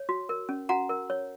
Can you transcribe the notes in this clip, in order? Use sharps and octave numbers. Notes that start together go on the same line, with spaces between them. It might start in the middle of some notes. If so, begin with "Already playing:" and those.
Already playing: C#5
F#4
A#4
C#4
F#4 F#5 A#5
A#4
C#5